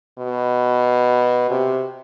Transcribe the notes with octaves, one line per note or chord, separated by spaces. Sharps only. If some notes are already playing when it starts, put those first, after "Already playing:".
B2
C3